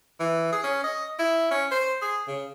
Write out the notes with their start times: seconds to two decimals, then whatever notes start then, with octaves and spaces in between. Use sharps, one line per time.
0.20 E3
0.52 G#4
0.63 C#4
0.84 D#5
1.19 E4
1.51 C#4
1.71 C5
2.02 G#4
2.28 C#3